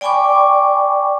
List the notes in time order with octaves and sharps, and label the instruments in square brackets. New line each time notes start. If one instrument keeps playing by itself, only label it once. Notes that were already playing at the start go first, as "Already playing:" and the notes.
[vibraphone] D5 G5 G#5 B5 C#6 D6